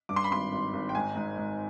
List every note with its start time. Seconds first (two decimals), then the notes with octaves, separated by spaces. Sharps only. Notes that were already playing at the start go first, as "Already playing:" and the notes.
0.09 G2 D6
0.16 C6
0.24 B5
0.31 G#1 C6
0.52 G#1
0.73 G#1
0.89 G5
0.95 G#2 G#5
1.16 G#2
1.37 G#2